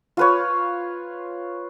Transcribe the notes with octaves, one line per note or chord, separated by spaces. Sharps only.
F4 B4 C#5